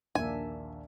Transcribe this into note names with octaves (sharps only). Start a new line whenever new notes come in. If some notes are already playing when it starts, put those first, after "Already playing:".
A#1 D#2 A#3 D4 E5 G#5